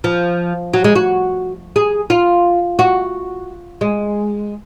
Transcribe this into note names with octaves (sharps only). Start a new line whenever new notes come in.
F3
F#3
G#3
F#4
G#4
F4
F#4
G#3